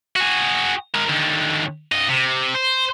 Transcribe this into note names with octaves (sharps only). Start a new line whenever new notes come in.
F#4 G#4
G#3 A#4
D#2 D3
G2 D#5
C3
C5